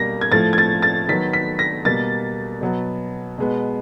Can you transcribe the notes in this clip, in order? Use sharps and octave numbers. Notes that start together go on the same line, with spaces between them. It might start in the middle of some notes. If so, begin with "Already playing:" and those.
Already playing: B2 G3 A#3 A#6
G#6
A2 F3 A3 A6
G#6
A6
A6
D#3 F#3 B3 B6
B6
A#6
B2 G3 A#3 A6
B2 F#3 B3
B2 G#3 B3